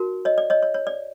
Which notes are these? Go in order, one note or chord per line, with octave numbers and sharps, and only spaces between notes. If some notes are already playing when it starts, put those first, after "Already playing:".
Already playing: D#4 F#4 A#4
C#5 D#5
D5
C#5 D#5
C#5
C#5
D5